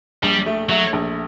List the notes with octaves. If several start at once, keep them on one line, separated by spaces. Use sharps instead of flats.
A#1 G3
A3
F#3 A3
A#1